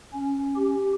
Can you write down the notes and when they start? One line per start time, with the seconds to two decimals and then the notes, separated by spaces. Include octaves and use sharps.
0.13 C#4
0.56 G4